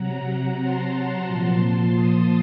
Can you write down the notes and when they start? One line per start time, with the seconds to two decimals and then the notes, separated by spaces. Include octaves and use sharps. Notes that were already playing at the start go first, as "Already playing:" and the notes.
Already playing: C3 F#3 F#5 A#5
0.59 A5 C6
1.26 A#2 F3
1.94 C6 D#6